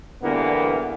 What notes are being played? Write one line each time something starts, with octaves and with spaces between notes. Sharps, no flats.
E2 D3 E3 G3 A#3 B3